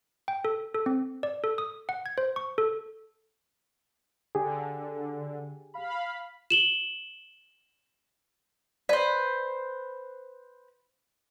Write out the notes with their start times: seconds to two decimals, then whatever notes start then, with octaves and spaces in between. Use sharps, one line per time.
0.28 G5
0.45 A4
0.75 A4
0.86 C4
1.23 D5
1.44 A4
1.58 D#6
1.89 F#5
2.06 G#6
2.18 C5
2.36 C#6
2.58 A4
4.35 D3 G4 G#4
5.74 F5 B5
6.50 E7 F#7 G7
8.89 B4 C5 D5